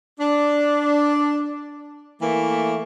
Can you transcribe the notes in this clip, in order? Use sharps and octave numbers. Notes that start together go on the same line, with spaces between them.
D4
E3 A3 A#3